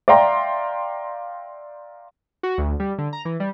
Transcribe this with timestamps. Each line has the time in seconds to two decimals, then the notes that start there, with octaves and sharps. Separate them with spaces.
0.08 D5 E5 F5 G5 A#5 C6
2.43 F#4
2.58 D2
2.80 G3
2.98 D3
3.13 A#5
3.25 E3
3.40 G3